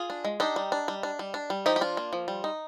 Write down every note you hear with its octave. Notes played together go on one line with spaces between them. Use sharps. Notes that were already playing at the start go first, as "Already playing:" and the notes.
Already playing: F4 G#4
D4
G#3
D4 D#4 G4
G3
D4
G3
D4
G3
D4
G3
F3 D#4 G4
G4
D4 F4
A#3
F3
G3
D#4